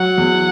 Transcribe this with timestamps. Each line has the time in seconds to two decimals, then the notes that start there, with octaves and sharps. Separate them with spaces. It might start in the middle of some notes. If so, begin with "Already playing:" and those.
Already playing: F#3 F#5
0.18 E2